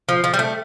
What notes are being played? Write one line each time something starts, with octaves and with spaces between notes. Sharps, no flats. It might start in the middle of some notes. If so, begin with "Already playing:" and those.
F3
F3
G3
A3